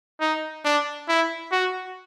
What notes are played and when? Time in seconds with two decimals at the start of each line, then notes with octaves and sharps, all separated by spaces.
0.20 D#4
0.65 D4
1.08 E4
1.52 F#4